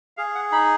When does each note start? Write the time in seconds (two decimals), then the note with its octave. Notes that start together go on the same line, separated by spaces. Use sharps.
0.17 G#4 F5
0.35 F#5
0.52 D#4 B5